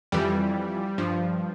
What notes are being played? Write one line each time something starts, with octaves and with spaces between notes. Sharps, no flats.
F2 E3 G3
G2 F3